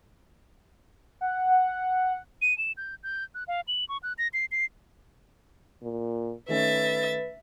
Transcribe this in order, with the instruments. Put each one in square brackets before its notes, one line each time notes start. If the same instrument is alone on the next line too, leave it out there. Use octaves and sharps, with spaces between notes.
[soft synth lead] F#5
[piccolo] D#7
E7
G6
G6
F#6
F5
F#7
C#6
F#6
A#6
C7
C7
[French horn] A#2
[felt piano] D#3 A3 C#4 [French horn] B4 [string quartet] E5 A6